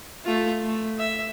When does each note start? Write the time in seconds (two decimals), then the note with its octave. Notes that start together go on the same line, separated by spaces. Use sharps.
0.25 A3 F4
0.63 A3
0.98 E5